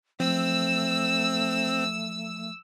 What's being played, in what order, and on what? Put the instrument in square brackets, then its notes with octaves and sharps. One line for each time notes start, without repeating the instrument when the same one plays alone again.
[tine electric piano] F3 [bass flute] A3 [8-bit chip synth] C4 [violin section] E6